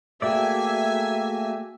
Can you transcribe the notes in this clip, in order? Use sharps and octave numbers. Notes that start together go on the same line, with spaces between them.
A3 A#3 F#4 G#4 D5 E5 G5 G#5